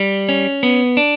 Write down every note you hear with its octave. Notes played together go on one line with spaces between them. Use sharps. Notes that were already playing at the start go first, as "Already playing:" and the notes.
Already playing: G3
C#4
B3
D4